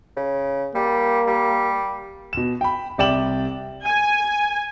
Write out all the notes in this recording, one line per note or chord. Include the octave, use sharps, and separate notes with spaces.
C#3
G3 A#3
G3
B2 E7
G5 B5
C2 G4 D5 G5 E7 F#7
G#5